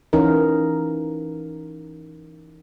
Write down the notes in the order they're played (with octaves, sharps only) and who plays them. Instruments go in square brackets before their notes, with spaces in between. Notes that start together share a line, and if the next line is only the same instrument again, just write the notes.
[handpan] E3 C#4 D#4 A#4